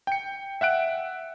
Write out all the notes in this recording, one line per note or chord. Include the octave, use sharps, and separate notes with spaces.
G5 C#7
E5 F#5 F#6 D7